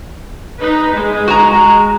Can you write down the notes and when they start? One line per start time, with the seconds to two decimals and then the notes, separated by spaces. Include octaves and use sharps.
0.59 D#4 B4
0.92 G#3
1.28 F#4 A#5